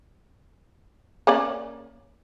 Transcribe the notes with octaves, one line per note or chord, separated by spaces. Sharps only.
A#3 C#4 D5